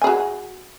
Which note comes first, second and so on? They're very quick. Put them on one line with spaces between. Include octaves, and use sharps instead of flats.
G#5 G#4 F#4